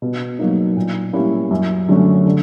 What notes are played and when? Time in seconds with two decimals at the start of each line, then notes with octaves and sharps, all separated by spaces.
0.02 B2
0.39 F#3 A#3 D#4
0.77 A#2
1.13 G3 A#3 C#4 E4
1.51 F#2
1.88 D3 F#3 A3 C#4
2.26 D3